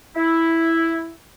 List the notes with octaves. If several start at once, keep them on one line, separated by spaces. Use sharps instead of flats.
E4